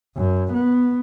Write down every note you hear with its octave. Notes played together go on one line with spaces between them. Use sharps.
F#2
B3